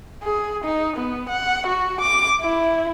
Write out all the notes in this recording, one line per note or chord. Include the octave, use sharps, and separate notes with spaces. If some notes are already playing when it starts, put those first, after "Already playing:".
G#4
D#4
B3
F#5
F#4
D6
E4